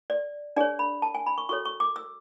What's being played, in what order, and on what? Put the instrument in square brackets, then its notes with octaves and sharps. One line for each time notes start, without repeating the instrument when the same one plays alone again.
[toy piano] D5
D4 G#4 C#5 D5
B5
A5
G#5
B5
C#6
F#4 A4 C#5 C#6
C#6
D6
E6